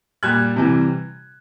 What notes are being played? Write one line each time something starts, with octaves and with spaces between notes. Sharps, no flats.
A#2 G3 F#6 G#6
C3 E3 G3